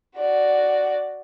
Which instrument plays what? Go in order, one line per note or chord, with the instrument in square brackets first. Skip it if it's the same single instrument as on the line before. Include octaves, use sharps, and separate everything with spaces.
[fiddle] F#4 D5